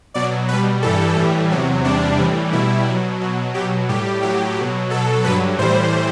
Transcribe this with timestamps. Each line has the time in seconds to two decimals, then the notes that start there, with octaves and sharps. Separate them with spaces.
0.14 B2 F#3 D5
0.48 B2 G3 B4
0.82 G2 E3 G3 A4
1.17 A2 E3 G3
1.51 E2 C3 F#3
1.84 E2 C3 G3 D4
2.19 A2 E3 G3
2.53 B2 G3 E4
2.87 B2 F#3
3.21 B2 F#3
3.54 B2 F#3 G4
3.89 A2 G3 G4
4.23 A2 F#3 G4
4.57 B2 F#3
4.90 B2 F#3 A4
5.24 G2 D3 F#3 B4
5.58 A2 E3 G3 C5